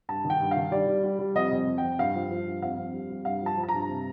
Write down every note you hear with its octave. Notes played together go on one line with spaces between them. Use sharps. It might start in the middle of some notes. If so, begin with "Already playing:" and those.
G2 A5
D#3
G5
G2
D#3 F5
G3 D5
G3
G3
G3
F2 D#5
F2
F2
G5
F2
G2 F5
F3
F3
G2
F2 F5
F2
G3
G3
G2 F5
F3 A5
F3
A5
A#5
G2
C3